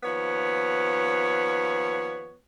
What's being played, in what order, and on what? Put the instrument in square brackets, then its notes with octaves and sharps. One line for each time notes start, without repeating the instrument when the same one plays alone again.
[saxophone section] D#2 F3 B3 C#5